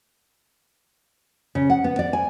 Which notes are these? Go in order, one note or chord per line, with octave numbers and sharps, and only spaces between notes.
C#3
F#5
B3
D5
G#5